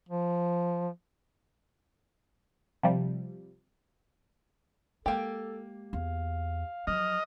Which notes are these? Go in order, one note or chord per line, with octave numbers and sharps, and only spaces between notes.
F3
C3 F3 G3
G#3 A#3 G4 A4
E2 F5
F3 F#3 D#5 F6